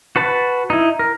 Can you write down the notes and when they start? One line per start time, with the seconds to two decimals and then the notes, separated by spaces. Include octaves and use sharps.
0.16 F#4 B4 A5
0.70 D#4 E4
0.99 A#4